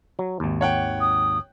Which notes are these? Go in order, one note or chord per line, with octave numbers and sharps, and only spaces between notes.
F#3
G#1 D#2
C#5 F#5 G5
D#6